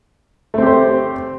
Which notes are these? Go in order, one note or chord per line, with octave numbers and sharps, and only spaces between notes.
A3 C4 G4 C5